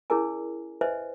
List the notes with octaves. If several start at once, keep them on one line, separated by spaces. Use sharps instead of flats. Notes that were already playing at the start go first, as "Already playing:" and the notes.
C#4 E4 G#4 A#4 D5 G#5
B4 C5 D#5 E5 G#5